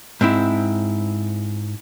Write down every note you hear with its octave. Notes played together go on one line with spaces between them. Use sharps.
G#2 C4 E4